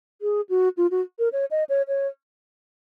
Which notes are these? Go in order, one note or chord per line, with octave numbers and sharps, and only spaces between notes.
G#4
F#4
F4
F#4
A#4
C#5
D#5
C#5
C#5